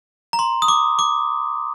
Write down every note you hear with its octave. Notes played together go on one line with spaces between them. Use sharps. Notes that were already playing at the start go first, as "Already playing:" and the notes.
A#5
C6
D#6
D6
D6